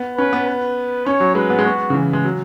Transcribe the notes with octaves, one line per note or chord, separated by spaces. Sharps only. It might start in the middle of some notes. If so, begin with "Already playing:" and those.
Already playing: B3
C#4 B4
B3
B4
C#4 C#5
F#3
G#3 B4
B3
G#3
B3 F#4
C#3
E3
G#3
F#3